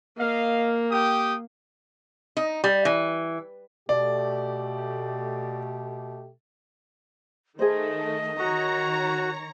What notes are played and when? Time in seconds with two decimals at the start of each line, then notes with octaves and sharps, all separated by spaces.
0.18 A#3 D#5 F5
0.91 G4 G5 D#6
2.37 D#4
2.64 G3
2.85 E3
3.89 B2 A3 G4 D5
7.59 D#3 A3 G#4 C5 D#5
8.39 D#3 F#4 C#5 A#5